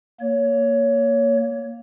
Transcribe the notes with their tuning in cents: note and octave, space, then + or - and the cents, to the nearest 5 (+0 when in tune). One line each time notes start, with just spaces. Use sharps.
A#3 +0 C#5 +15